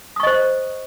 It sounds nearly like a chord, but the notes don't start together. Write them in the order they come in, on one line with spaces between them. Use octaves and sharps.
D#6 C#6 D#5 C5